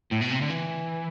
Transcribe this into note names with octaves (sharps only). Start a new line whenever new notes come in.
A2
B2
C3
D3
E3